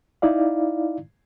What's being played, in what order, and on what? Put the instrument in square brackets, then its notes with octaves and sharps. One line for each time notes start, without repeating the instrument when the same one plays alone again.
[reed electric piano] D#4 E4 D5 F5